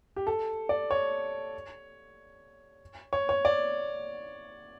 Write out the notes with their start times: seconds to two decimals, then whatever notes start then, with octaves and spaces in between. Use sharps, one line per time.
0.16 G4
0.27 A4
0.69 D5
0.91 C#5
3.13 C#5
3.29 C#5
3.45 D5